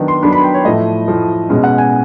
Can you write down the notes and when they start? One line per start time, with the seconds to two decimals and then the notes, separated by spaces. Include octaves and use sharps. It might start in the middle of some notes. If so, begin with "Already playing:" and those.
Already playing: D#3 F#3 B3 D4
0.08 C6
0.22 D#3 F#3 B3 D4 B5
0.33 B5
0.44 G5
0.54 C#5
0.65 A2 F3 A3 D#5
1.08 A2 F3 A3
1.50 B2 G#3 C#4
1.64 F#5
1.78 G#5